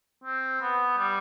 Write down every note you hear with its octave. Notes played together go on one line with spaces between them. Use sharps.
C4
B3
G3